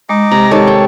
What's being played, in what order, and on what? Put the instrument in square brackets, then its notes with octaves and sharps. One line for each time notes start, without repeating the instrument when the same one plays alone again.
[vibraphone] G#3 [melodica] D#4 D#5 D6
[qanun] C3 [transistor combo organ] A#5
[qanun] D#3 G4 A5 [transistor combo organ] A4 C#5
[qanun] G5